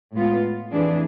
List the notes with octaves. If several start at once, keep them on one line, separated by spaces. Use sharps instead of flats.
A2 G#3 B3 F4
F2 E3 A3 D4 G#4